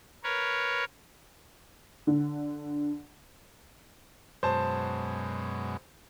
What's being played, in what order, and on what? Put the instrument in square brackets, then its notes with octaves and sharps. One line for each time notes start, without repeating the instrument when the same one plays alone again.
[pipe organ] A#4 B4 C#5
[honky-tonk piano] D3
[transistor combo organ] F#2 B2 G#3 [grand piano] C5 A5